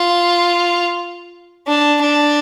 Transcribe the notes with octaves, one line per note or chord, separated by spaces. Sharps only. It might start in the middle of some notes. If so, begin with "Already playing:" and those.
Already playing: F4
D4
D4